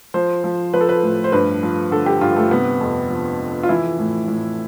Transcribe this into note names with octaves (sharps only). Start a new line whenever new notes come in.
F3 C5
F3
F3 B4
A4
B4
A2
C5
G2 B4
F3
D3 A4
G4
G2 F4
A3
C3 B3
F2
F3
F3
F4
E3 E4
A2
A2